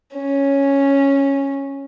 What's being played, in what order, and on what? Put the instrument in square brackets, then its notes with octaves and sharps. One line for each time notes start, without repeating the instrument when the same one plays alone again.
[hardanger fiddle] C#4